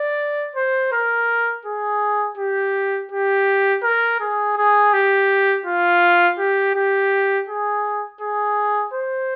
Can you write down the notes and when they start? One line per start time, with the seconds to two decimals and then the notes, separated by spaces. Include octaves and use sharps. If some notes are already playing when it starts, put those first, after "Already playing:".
Already playing: D5
0.56 C5
0.92 A#4
1.65 G#4
2.37 G4
3.11 G4
3.83 A#4
4.20 G#4
4.57 G#4
4.93 G4
5.66 F4
6.38 G4
6.75 G4
7.48 G#4
8.21 G#4
8.94 C5